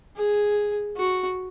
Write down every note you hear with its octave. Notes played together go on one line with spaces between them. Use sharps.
G#4
F#4